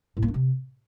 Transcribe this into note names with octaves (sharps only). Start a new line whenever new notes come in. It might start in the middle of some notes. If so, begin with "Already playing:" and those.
A2
A#3
D4
C3